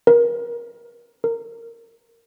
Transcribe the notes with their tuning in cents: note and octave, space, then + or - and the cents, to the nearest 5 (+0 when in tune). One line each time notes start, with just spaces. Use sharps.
A#4 +25
A#4 -15